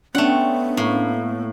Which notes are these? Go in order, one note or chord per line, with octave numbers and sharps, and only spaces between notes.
A3 B3 C#4 D4 C#5 F#5 G5 C6
A2 A3 A#3